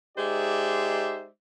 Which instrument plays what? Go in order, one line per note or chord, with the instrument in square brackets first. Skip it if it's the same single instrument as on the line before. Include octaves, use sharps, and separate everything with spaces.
[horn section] G#3 D#4 G4 C5 D5 E5